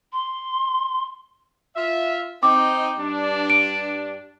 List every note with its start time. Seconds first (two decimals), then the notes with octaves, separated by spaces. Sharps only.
0.12 C6
1.76 F4 E5
2.43 C4 D#4 D6
2.98 G2 D4
3.50 D7